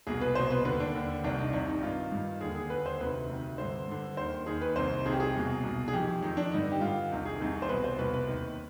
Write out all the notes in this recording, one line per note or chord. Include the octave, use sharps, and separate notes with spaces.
C2 B2 G#4
B4
C2 B2 C5
B4
D#2 D3 B4
D4
D#2 D3
C2 C3 D#3 D4
D#4
C2 C3 D#3 D4
D#4
G2 D#3 F4
G2 D#3
D#2 D3 G#4
G#4
D#2 D3 B4
C5
D2 C3 D#3 B4
D2 C3 D#3
G2 D3 C5
G2 D3
D#2 D#3 C5
D#2 D#3 G#4
B4
C2 C3 D#3 C5
C2 C3 D#3 G#4
G4
G#4
C2 B2
C2 B2
G#4
F2 D#3 G4
F2 D#3 D#4
D4
G2 D3 D#4
G4
G2 D3 F4
C2 C3 D#3
G#4
C2 C3 D#3
C5
C2 B2 B4
C5
C2 B2 B4
B4
D#2 D#3